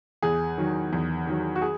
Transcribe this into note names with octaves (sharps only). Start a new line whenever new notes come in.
E2 G#4
D#3 F#3
E2
D#3 F#3
F#4
G#4